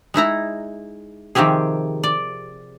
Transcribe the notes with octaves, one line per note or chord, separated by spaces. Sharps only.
G#3 D#4 E4 A#5
C3 D#3 F3 C4 G4 G#4
D5